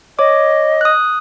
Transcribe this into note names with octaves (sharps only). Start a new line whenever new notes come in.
C#5 D#5 D6
D#6 F#6